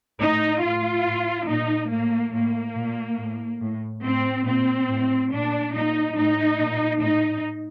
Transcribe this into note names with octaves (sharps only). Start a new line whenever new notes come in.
A2 D#4
A2 F4
A2
A#2 D#4
A2 A#3
A2 A#3
A#2
A2
A2
A2 C4
A#2 C4
A2
A#2 D4
A#2 D#4
A2 D#4
A#2
A2 D#4